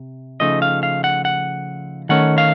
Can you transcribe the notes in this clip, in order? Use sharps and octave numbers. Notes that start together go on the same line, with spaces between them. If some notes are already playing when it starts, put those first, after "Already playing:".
Already playing: C3
C#3 F3 A3 D#4 D#5
F5
F5
F#5
F#5
D#3 A3 C#4 F#5
F5